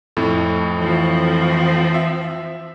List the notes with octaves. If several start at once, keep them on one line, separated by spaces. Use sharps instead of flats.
F2 A2 A3
E3 F3 C4
E5